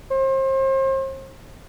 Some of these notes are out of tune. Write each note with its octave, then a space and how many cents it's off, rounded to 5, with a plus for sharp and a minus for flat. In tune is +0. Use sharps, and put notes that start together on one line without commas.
C5 +35